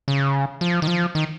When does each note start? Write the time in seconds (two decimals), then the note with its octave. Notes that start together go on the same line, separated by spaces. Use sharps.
0.08 C#3
0.61 F3
0.82 D#3
0.87 F3
1.15 D#3